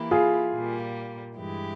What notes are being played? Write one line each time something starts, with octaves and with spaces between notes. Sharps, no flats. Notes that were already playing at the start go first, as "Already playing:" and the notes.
Already playing: E3 A#3 E4 G4
F4 G#4
A#2 G3 A#3
G2 E3 G#3 E4 G4